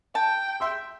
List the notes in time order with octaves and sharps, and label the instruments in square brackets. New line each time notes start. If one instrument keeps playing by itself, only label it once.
[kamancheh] G5 [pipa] A5
[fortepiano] E5 C6 E6